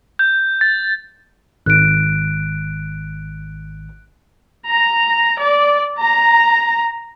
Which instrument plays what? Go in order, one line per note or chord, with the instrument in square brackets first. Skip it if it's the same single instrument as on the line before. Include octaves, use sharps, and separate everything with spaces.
[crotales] G6
A6
[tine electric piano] G#1 [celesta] F#6 D7
[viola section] A#5
D5
A#5